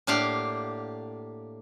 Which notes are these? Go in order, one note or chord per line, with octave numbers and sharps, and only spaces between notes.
A2 A#3 D4 G4 F5 F#5